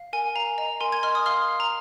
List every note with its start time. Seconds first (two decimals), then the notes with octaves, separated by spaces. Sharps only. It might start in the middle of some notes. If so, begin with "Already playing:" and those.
Already playing: F5
0.13 A#4 G#5
0.35 F5 A#5
0.58 D#5 A#5
0.80 A#4 G#5 C6
0.92 G#6
1.03 D#5 C6 F6
1.15 D#6
1.26 F5 C6 F6
1.48 F5
1.60 A#5